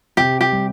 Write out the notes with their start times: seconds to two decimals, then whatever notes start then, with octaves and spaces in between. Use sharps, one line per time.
0.17 C3 G4
0.41 G4
0.52 G3